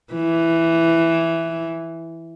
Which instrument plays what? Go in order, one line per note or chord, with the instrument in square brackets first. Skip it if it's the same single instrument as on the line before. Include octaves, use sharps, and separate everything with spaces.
[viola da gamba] E3